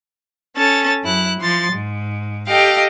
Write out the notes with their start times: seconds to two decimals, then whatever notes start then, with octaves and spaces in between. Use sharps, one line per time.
0.56 C#4 A4 A6
1.03 F#2 E4 F#6
1.39 F3 C6 A6
1.72 G#2
2.48 G4 A4 D#5 F5 G5